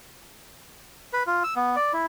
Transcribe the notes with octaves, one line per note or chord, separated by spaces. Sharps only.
B4
F4
E6
B3
D5
E4